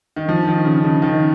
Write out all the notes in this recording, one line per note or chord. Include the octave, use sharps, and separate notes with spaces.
D#3
F3
D#3
C#3
C#3
D#3